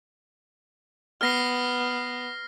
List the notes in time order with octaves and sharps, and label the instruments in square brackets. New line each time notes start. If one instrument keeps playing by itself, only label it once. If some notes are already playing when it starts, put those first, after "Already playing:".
[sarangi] B3 [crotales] F6 A#6 C7